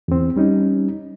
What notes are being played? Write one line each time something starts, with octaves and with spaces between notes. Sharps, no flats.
E2 C4
G3 C#4 D#4